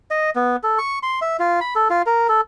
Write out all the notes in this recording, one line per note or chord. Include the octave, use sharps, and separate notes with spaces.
D#5
B3
A4
C#6
C6
E5
F4
B5
A4
F4
A#4
A4